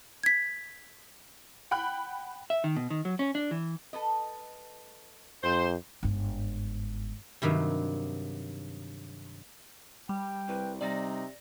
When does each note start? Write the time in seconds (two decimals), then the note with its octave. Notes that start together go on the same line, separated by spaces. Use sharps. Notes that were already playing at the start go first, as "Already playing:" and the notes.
0.23 G#6 B6
1.71 F#5 G5 B5 F#6
2.50 E5
2.64 D#3
2.76 B2
2.90 D#3
3.05 F#3
3.19 C#4
3.35 D4
3.51 E3
3.93 A4 B4 D#5
5.43 F2 C5
6.03 G1 G#2
7.42 G2 C3 D#3 F#3
10.09 G3 G5
10.48 C2 B4
10.81 C3 G3 D#4 D5 A#6